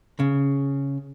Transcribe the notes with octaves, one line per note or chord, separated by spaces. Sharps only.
C#3